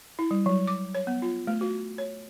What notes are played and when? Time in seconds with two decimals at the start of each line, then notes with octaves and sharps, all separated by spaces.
0.19 E4
0.31 G3
0.46 F#3
0.67 D6
0.95 C#5
1.07 B3
1.22 F4
1.47 A3
1.61 F#4
1.98 C#5